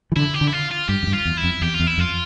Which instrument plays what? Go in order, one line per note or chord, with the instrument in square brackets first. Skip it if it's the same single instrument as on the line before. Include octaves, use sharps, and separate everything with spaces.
[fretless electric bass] E3
[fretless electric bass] D3 [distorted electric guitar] E4
[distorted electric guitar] G4
[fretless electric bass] D3
[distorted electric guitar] E4
F4
F4
[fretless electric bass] G2 [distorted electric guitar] G4
[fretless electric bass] F2
G2
[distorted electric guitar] F4
[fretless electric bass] E2
[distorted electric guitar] E4
[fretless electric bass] F2
[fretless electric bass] E2 [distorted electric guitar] G4
[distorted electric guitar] F4
[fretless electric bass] E2
[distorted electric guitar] E4
[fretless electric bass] F2 [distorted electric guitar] F4